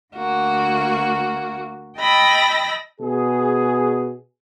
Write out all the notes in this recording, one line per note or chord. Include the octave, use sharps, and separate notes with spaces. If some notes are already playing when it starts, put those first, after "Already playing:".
D2 A#3 F#4
D#5 G5 A5 B5 E6 A#6
B2 G#4